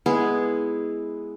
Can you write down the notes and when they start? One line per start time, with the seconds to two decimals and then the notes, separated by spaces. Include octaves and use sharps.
0.06 G#3 B3 E4 G#4